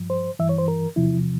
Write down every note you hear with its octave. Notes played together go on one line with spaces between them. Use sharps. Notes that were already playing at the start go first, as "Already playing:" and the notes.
Already playing: G2 F3
C5
G2 E3 E5
C#5
C5
A#4
E2 C3 F3 E4